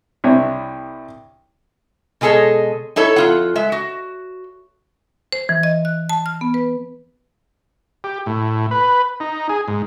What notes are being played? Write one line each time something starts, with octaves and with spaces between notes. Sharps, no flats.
C2 C3 D4 C#5
B2 G#3 G#4 A4 C#5 D#5
D#4 E4 A4 C#5
F2 F4 F#5
G#3 E5
F#4
C5
E3
D#5
F#6
A5
F6
B3
B4
G4
A2
B4
D#4
G#4
G#2